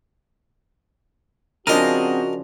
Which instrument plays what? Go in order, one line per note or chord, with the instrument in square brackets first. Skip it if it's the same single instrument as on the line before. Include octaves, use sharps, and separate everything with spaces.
[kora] C#3 F3 D4 [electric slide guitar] C4 G#4 [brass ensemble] F#4 [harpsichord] A#4 D#5